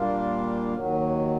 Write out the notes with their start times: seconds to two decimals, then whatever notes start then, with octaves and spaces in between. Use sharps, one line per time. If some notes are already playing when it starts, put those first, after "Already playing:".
Already playing: A#2 G3 A#3 D4 F4
0.73 D#2 D#3 F#3